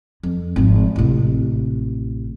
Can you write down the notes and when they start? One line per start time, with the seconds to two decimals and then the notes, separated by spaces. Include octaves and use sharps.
0.23 F2
0.56 G#1 F3
0.96 A1 C3